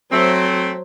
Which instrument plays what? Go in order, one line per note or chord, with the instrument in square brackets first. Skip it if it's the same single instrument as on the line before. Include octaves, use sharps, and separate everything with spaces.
[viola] F#3 C5 [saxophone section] A3 C4